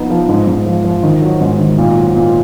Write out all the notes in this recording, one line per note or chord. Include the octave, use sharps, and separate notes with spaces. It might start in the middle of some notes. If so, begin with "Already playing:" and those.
Already playing: F3 B3 D#4
F3
G#2
G#2
F3
F3
D#3
F#3
G#2
D#3
A#2
F#3
A#2